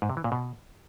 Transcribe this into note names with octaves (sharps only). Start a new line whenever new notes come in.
G#2
C3
E3
A#2
B2